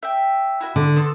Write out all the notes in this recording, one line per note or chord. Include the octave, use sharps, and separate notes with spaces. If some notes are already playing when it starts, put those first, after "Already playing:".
E5 G5
E4 F#4 E5
D3
B3 C4 A4